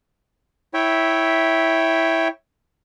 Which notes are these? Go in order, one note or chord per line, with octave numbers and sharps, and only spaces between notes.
E4 C#5 E5 G5